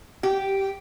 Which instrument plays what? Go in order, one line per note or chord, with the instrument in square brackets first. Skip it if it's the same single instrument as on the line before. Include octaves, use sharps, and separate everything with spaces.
[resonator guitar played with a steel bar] G4